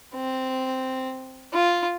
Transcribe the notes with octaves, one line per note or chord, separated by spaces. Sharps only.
C4
F4